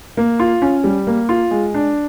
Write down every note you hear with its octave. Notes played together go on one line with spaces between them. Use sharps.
A#3
F4
C#4
G3
A#3
F4
G#3
D4